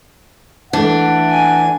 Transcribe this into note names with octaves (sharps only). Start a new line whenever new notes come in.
E3 A3 D4 F#5
G#5